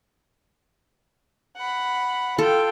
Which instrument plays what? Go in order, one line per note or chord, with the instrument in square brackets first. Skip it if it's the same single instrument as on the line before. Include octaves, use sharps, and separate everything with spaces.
[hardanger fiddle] F#5 B5
[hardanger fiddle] F4 G5 [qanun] A4